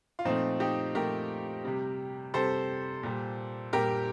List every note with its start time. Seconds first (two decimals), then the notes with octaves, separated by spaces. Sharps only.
0.19 F4
0.25 A#2 F3 A3 C4 D#4
0.60 D#4 G4
0.95 A#2 F3 A3 G4 A#4
1.65 C3 G3
2.34 C3 G3 A4 C5
3.03 A#2 G3
3.73 A#2 G3 G4 A#4